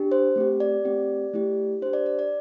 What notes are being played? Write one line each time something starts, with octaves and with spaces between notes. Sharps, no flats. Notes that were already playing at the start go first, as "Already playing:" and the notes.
Already playing: D4 G4
C5
A3 C4 G4
D5
A3 C4 G4
A3 E4 G4
D4 G4 C5
D5
D5
D5